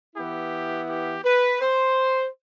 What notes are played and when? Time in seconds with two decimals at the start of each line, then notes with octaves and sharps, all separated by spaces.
0.16 E3 B3 E4 G4
0.89 G4
1.25 B4
1.61 C5